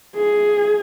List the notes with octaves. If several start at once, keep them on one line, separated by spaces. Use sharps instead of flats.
G#4